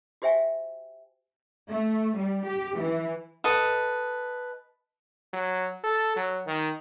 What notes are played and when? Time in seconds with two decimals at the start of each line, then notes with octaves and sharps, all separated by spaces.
0.22 F#4 G4 C5 E5 G5 G#5
1.69 A3
2.16 G3
2.46 G4
2.78 E3
3.44 A4 B4 D#5 D#6
5.33 F#3
5.84 A4
6.16 F#3
6.47 D#3